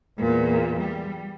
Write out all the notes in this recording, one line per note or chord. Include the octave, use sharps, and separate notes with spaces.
E2 A#2
G3